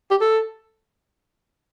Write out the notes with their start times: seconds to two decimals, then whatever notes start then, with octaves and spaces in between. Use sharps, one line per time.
0.11 G4
0.21 A4